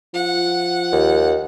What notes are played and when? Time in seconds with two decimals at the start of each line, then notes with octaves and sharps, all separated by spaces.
0.14 F3 F#5
0.92 D#2